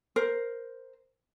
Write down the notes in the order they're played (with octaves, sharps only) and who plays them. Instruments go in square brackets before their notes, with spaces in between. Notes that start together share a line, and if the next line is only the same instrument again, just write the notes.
[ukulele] A#4 C5